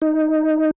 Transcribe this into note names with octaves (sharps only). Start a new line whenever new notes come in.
D#4